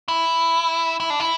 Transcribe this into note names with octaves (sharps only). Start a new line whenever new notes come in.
E4
E4
D4
E4